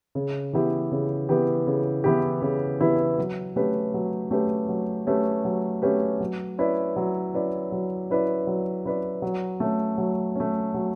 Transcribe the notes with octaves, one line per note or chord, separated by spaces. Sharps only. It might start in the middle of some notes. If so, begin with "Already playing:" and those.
C#3
E3 B3 E4 G4
C#3
E3 B3 E4 G4
C#3
E3 B3 E4 G4
C#3
E3 B3 E4 G4
F#3
A3 C#4 G4 B4
F#3
A3 C#4 G4 B4
F#3
A3 C#4 G4 B4
F#3
A3 C#4 G4 B4
F#3
C#4 E4 B4 D5
F#3
C#4 E4 B4 D5
F#3
C#4 E4 B4 D5
F#3
C#4 E4 B4 D5
F#3
A3 C#4
F#3
A3 C#4
F#3